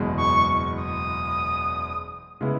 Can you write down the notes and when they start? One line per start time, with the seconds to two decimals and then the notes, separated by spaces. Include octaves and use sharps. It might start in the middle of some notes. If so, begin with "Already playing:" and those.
Already playing: F#1 E2 B2 G#3
0.19 C#6
0.83 D#6
2.41 C#3 G#3 B3 E4